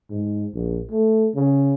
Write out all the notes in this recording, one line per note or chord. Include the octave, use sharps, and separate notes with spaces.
G#2
A#1
A3
C#3